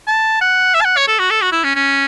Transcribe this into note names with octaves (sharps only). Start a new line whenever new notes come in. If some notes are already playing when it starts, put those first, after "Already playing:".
A5
F#5
E5
A5
F#5
C#5
A4
F#4
A4
F#4
E4
C#4
C#4